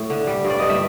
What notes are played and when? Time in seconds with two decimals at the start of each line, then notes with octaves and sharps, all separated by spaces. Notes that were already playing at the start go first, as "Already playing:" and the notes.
Already playing: A2
0.10 D3
0.27 G3
0.45 G2
0.50 D5
0.59 G2 D#5
0.70 E5